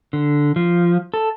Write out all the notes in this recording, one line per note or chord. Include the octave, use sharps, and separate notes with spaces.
D3
F3
A4